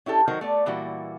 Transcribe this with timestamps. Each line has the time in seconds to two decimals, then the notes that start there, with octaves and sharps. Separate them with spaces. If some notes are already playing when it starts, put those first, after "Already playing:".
0.06 C#4 E4 G4 A4
0.28 D#3 F#3 D#4 F#4 A#4 C5
0.41 A3 B3 D5
0.66 A#2 E3 G3 A#3 E4 F#4